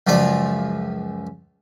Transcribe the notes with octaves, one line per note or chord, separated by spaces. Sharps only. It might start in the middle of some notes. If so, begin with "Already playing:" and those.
C#2 F#2 F3 F4 D5